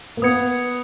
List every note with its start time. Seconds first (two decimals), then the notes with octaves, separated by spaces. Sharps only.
0.17 A#3
0.22 B3 D#6 G#6 C#7